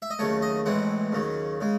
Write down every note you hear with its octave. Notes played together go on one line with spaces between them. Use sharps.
E5
D#5
D#2 C#3 F#3 A3 C#5
D#5
A1 A2 E3 G#3 C4 F#5
D#2 C#3 F#3
C#3 G#3